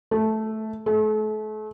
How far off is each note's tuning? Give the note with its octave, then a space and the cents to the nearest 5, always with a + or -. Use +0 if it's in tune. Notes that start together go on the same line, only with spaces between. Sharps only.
A3 -5
A3 -35